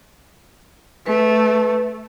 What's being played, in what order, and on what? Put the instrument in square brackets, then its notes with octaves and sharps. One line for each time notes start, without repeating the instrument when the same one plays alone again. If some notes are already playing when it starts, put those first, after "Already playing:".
[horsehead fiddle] A3 [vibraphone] B4